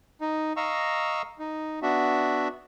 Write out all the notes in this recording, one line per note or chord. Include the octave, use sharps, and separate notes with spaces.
D#4
D#5 F5 A#5 C#6 E6
D#4
B3 D4 F#4 E5